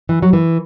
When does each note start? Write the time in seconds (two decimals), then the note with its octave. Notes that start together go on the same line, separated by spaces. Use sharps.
0.09 E3
0.22 F#3
0.33 E3